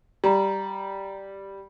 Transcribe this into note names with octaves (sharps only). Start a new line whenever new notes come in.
G3 G4 A#5